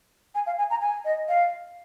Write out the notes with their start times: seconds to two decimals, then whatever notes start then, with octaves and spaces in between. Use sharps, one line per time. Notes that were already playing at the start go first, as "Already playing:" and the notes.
0.35 G#5
0.46 F5
0.58 G#5
0.70 A#5
0.81 G#5
1.05 D#5
1.29 F5